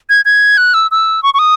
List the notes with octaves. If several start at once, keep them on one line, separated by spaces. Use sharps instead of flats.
G#6
G#6
F#6
E6
E6
C#6
C#6
D#6